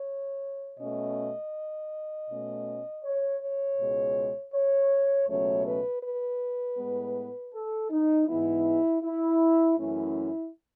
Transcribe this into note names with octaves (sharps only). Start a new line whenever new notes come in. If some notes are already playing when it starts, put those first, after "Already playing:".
Already playing: C#5
B2 A3 C#4 D#5
B2 A3 C#4
C#5
C#5
C#2 B2 G#3
C#5
C#2 B2 F#3 A3 C#4 C#5
B4
B4
A2 G#3 B3
A4
D#4
G#2 E3 G#3 B3 E4
E4
F#2 E3 A3 C#4 E4